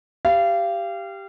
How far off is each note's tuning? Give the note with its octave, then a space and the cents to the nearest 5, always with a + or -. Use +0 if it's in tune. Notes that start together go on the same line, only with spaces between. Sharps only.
G4 +0 F5 -30